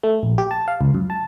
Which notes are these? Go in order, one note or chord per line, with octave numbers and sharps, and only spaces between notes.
A3
A#1
G4
A5
F5
C#2
F#2
A5